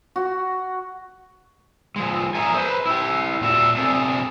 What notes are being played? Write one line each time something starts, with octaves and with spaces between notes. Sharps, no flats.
F#4
F3 G#3
G#4 A#4 E5 G#5
B4 C5
E4 G4
A#2 A3 F#4 B4 E5
C3 A3 C4 D4 G#4